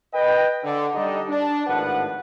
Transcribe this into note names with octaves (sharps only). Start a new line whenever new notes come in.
B4 D#5 G5
D3
G3 D4 D#4 G4 A4 D#5
D4
G#1 A2 F3 D4 B4 F#5